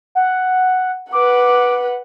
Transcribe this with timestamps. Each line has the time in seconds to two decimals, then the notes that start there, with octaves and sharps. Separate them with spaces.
0.15 F#5
1.12 B4 F#5 D6